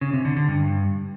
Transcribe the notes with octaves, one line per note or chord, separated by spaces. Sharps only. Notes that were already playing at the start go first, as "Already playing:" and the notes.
C#3
C3
D3
D3
G2